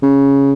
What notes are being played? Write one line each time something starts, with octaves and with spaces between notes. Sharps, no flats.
C#3